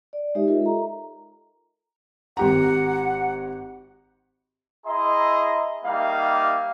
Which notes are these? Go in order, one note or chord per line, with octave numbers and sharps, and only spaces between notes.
D5
G#3 D#4 G4 C#5 E5
F4 A#4 D#5 E5
A4 A#5
G#1 G4 F#5 A#5
E4 G#4 D#5 E5 A#5 C6
G3 A#3 D#4 E5 F5